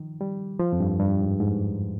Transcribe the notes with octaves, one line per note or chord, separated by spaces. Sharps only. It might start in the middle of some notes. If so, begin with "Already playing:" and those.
Already playing: D#3 F3
G3
F3
F2
G2
G2
G#2
G#2